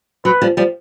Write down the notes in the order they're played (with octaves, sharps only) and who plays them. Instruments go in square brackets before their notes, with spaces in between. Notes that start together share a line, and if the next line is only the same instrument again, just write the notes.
[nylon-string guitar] F#3 [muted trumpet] B4
[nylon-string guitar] F3 G3
F3 G3